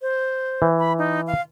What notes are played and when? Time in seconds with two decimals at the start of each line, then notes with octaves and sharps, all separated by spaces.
0.02 C5
0.62 E3
0.79 B5
0.98 D#4
1.27 F5